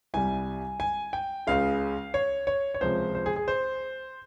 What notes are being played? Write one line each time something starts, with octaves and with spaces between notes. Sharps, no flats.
C2 C3 G3 G#5
G#5
G5
C#2 C#3 G#3 F5
C#5
C#5
C#5
C#2 C3 F3 G#3 C5
C5
G#4
G#4
C5